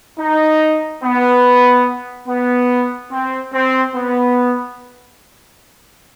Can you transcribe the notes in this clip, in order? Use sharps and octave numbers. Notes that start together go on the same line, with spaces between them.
D#4
B3
B3
C4
C4
B3